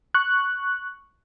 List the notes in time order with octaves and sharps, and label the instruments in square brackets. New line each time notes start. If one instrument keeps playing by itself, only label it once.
[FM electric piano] C#6 F#6